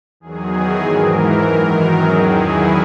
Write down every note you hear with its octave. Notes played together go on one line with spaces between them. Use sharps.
E2 D#3 F#3 G#4
G#2 E3 A#4
F#2 D#3 F#3
E2 D#3 F#3 G#4
E4